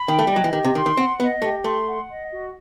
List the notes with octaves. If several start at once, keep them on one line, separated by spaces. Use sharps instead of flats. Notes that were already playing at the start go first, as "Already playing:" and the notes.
Already playing: B5
D#3 G5
A3
G3 D#5
F#3
E3
D#3 G4
C3
D#3 C6
D#3
C4 F#5
B3 D#5
A3 G4
A3 C6
F#5
D#5
F#4